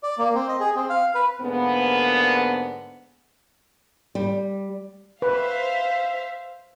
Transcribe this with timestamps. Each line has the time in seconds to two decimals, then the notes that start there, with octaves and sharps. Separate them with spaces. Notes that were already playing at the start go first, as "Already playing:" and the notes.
0.03 D5
0.18 A#3
0.35 C4
0.48 D#5
0.60 G#4
0.75 C4
0.90 F5
1.15 B4
1.41 G#2 D3 A#3 B3
4.15 G3
5.22 B4 C5 E5 F5